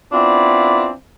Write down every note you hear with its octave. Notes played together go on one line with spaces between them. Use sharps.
B3 C4 D4 E4 F4